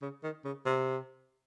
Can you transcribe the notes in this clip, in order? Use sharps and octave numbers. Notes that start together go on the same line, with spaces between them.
C#3
D#3
C#3
C3